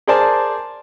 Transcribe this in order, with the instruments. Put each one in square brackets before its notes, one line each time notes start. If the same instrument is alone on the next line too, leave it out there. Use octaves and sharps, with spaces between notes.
[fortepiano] G#4 A#4 C5 D5 G#5 A5